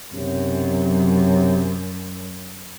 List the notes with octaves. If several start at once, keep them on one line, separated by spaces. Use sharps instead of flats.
B1 F#2 C3 F#3